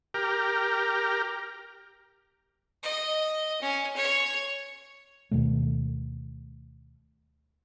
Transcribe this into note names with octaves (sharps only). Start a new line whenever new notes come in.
G4 A#4
D#5
C#4
C#5
D2 B2 D#3 A3